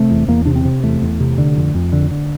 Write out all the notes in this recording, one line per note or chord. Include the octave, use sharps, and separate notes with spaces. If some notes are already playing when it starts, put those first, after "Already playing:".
Already playing: C3 A3
E2
E2 A#3
C3 D4
C4
C3
E2 A3
E2
C3
D3
F2
F2
D3
D3